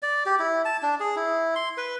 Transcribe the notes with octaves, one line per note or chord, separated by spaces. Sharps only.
D5
G4
E4
A5
D4
G#4
E4
C6
B4